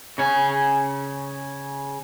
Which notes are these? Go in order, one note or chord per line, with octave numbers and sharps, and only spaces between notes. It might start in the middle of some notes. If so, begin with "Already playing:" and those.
C#3 C#5 G#5